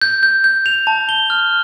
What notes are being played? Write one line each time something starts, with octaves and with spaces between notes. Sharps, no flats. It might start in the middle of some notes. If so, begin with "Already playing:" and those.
G6
G6
G6
F7
A5
G7
F6